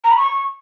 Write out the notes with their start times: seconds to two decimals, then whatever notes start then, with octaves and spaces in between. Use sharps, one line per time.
0.04 A#5
0.11 B5
0.17 C#6